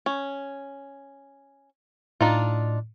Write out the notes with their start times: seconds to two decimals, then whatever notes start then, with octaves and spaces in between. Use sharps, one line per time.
0.06 C#4
2.21 A2 D4 D#4 F4